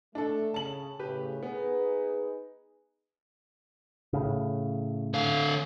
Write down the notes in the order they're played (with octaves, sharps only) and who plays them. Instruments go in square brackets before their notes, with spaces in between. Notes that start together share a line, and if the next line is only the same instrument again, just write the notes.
[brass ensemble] A3 [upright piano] D4 A4
[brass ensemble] C#3 [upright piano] A5 F#7
[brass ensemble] A2 C#3 [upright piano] G4 B4
[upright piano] B3 [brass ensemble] D#4 G#4 B4
[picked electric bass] A2 C#3
[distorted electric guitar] D3 F5